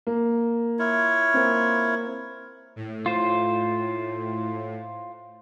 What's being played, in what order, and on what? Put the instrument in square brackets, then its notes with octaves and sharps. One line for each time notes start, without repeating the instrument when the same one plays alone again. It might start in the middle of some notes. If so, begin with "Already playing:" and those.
[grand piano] A#3
[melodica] E4 F4 C#5
[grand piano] A#3 C4
[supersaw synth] A2
[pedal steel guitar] F4 C5